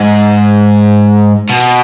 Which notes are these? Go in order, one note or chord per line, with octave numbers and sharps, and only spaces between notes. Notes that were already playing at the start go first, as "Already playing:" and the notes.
Already playing: G#2
B2